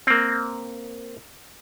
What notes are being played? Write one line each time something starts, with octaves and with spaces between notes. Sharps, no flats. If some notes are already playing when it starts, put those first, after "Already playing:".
A#3 C4